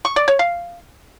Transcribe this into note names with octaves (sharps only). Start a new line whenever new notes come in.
C#6
D5
C#5
F5